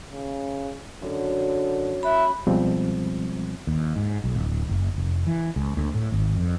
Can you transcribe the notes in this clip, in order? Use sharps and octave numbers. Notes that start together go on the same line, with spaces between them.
C#3
F#2 D3
E5 B5 F#6
C#2 B2 F3 G3 G#3 C4
D#2
G#2
B1
D1
F#1
F1
E3
C#2
D2
A2
G#1
F2